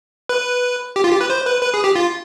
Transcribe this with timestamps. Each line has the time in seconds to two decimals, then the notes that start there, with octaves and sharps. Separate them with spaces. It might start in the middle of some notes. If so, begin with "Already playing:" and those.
0.29 B4
0.96 G4
1.04 F4
1.12 G4
1.21 B4
1.30 C5
1.46 B4
1.62 B4
1.74 G#4
1.84 G4
1.96 F4